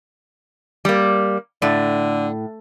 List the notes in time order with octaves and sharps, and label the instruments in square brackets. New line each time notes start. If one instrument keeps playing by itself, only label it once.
[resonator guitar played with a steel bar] G3 A#3
[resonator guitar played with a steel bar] A2 [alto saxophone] D3